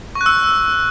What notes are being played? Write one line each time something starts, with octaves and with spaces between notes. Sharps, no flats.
C#6
F#6
E6